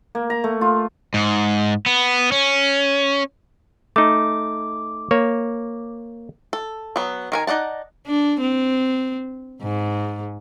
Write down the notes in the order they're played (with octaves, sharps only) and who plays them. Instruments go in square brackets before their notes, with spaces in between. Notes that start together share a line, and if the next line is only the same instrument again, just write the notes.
[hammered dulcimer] A#3
A#5
A3
F4
[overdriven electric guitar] G#2
B3
C#4
[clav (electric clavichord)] A3 D#4 [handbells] D6
[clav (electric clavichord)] A#3 C#5
[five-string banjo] A4
F#3 B3
D#3 A#4 G#5
D#4 D5 F#5 A5
[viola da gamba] D4
C4
G#2